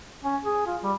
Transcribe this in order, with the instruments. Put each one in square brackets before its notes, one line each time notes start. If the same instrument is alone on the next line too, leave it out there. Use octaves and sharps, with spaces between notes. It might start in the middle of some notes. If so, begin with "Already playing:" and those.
[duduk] C#4
G#4
F4
G3